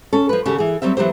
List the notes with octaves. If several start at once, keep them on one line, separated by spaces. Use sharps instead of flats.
C#4 A4
F3 B4
D#2 C#3 F#4 G4 A4
E3 G#4
F#3 G3 C4 E5
E3 F#3 B3 G4 C5